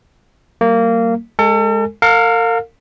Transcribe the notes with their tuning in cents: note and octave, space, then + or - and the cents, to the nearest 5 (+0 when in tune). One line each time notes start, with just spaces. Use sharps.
G3 -45 A#3 -20
G#3 +0 A4 +40 G#5 -5
A#4 -40 F5 +20